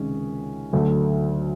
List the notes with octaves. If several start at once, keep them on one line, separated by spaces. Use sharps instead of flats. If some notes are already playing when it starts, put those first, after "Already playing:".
Already playing: C#2 C3 D#3 G#3 C#4
D2 D3 F#3 A3